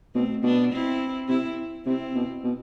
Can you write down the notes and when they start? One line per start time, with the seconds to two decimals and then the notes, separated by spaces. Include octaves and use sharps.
0.15 B2 A3 C4
0.43 B2 B3 D4
0.72 C4 E4
1.29 C3 C4 E4
1.86 C3 C4 E4
2.15 B2
2.44 B2